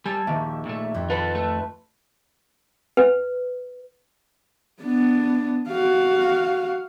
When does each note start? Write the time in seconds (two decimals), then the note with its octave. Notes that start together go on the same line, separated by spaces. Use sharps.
0.06 G3 A4 G#5 A6
0.27 A#1 D#2 D#3 E5
0.66 A#2 A3
0.94 F2
1.10 F4 A4 B4 A5 B5
1.35 A3 A4
2.97 B4
4.82 B3 D4
5.68 F#4 F5